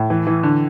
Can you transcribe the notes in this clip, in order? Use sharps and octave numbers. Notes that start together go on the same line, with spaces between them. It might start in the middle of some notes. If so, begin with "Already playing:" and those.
Already playing: A2
E3
E3
D3